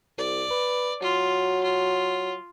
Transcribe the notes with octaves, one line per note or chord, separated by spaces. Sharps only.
C2 D5
B4
F#3 F4
F4